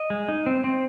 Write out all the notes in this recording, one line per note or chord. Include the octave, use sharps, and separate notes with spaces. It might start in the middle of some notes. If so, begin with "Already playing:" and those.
Already playing: D#5
G#3
D#4
C4
C4